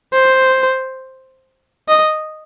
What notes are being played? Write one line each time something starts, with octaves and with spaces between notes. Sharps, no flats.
C5
D#5